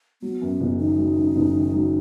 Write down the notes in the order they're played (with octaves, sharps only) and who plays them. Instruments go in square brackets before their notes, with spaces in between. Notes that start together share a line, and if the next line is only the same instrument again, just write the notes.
[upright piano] F#3 [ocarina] B3
[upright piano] F#2
F#1
[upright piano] D#3 [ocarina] D#4
[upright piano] F#3
F#2
F#1
D#3
F#3